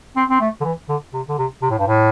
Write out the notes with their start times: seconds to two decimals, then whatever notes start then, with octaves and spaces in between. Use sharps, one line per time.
0.16 C4
0.30 C4
0.41 A3
0.61 D3
0.65 E3
0.89 D3
1.13 C3
1.28 D3
1.38 C3
1.62 C3
1.70 A2
1.79 G2
1.87 A2